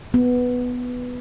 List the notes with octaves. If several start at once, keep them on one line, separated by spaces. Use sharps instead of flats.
B3